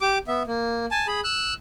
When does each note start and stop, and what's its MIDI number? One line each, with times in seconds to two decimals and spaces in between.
0.01 0.18 67
0.01 0.18 86
0.28 0.43 59
0.28 0.43 76
0.47 0.86 58
0.91 1.07 80
0.91 1.07 81
1.08 1.21 68
1.08 1.21 83
1.24 1.54 88
1.24 1.54 90